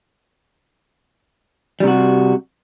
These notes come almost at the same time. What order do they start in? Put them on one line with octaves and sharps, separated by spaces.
G3 C3 F#4